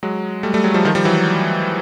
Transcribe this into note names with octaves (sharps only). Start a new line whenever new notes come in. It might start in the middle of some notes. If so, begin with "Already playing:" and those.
F#3 G#3
G3 A3
G3 A3
F#3 G#3
F3 G3
D#3 F3
F3 G3
E3 F#3